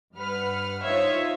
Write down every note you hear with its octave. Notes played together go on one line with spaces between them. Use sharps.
G2 B4 F#5 F6
D#4 F4 C5 C#5 E5 F5